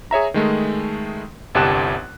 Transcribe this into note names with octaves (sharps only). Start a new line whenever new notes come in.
G#4 C#5 E5 A#5
D#3 G#3 A3
G1 C2 G4 A5 F#6 E7